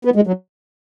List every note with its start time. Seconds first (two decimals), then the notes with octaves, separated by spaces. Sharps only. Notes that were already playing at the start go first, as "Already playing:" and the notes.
0.05 B3
0.16 G#3
0.27 F#3